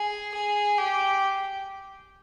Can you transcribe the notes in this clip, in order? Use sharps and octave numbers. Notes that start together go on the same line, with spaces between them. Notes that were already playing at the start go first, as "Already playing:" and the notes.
Already playing: G#4
G#4
G4